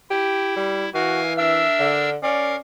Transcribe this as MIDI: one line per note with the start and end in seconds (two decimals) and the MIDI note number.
0.10 0.90 64
0.10 0.56 67
0.57 0.86 55
0.94 1.63 52
0.94 1.21 66
0.94 1.33 70
0.94 1.33 77
0.94 1.33 80
1.38 2.10 62
1.38 2.10 70
1.38 1.94 76
1.38 2.10 88
1.79 2.16 50
2.23 2.57 61
2.23 2.56 70
2.23 2.60 74
2.23 2.56 77